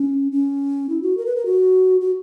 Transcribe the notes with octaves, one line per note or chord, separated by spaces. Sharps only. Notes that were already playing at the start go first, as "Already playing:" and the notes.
Already playing: C#4
C#4
E4
F#4
A#4
B4
A#4
F#4
F#4